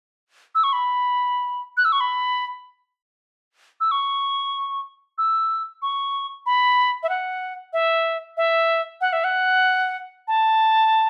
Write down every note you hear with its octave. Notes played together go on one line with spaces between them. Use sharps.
E6
C#6
B5
F#6
E6
C#6
B5
E6
C#6
E6
C#6
B5
E5
F#5
E5
E5
F#5
E5
F#5
A5